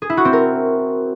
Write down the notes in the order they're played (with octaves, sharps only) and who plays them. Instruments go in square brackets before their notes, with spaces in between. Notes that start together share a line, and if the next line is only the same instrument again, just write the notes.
[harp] G#4
E4
F#4
C4
A#4